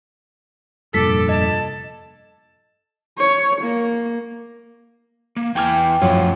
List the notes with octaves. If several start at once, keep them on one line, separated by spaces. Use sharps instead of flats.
F1 G2 A#2 A4 D6 B6
D#5 A5
C#5
A#3
A#3
E2 E3 G5 G#5 D6 F6
F#2 A2 F3 F4